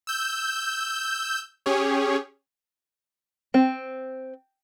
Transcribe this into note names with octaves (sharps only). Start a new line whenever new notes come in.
E6 G6
C#4 G4 G#4 C#5
C4